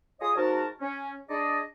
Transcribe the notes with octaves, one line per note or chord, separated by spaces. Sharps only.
F4 G#4 C#5 D#5 D#6
G#2 F#4 A#4 A5
C#4
D4 G#4 D5 D#5